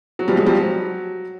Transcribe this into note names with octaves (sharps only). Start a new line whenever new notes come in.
F#3
F3 G3
F#3 G#3
F3 G3
F#3